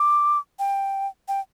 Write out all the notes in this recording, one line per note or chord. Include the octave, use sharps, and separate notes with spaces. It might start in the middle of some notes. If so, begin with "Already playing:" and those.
Already playing: D6
G5
G5